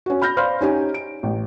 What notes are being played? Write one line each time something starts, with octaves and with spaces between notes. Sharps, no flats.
C#4 F#4
B5 F6 G6 A#6
C5 D5 F5 B5 C6 F6
C#4 D#4 G4 G#5
D7
A1